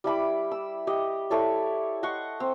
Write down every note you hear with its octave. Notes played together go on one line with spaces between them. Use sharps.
G3 E4 B5 D6
E6
G4 D#5
E4 A4 C#5 D5
D#5 F#5 C6 C#6
C4